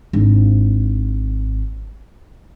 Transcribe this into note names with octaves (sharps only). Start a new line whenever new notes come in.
G#1 D4